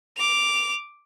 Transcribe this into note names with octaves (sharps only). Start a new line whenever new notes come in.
D6 F7